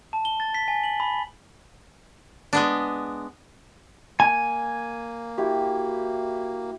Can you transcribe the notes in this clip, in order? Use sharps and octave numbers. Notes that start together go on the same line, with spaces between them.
A5
G7
A6
B6
G#5
F#7
B5
G#3 B3 D4
A#3 G#5
E4 F#4 G4